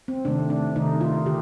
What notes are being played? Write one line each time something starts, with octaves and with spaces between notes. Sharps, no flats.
C4
C3 D#3 A3 D4
D4
C3 D#3 A3 D#4
F4
D3 G4